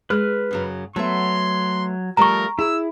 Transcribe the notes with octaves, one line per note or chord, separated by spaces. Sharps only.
G#3 B4 F6
F#2 C#3 F#3
F#3 A3 B3 E5 C6
F3 G3 A3 A#4 A#5 C#6
E4 G#4 E6